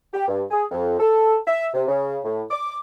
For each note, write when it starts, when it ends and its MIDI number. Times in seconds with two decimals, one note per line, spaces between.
0.14 0.28 67
0.28 0.42 43
0.51 0.65 68
0.71 0.97 41
1.00 1.36 69
1.47 1.68 76
1.74 1.84 48
1.88 2.18 49
2.24 2.43 45
2.51 2.79 86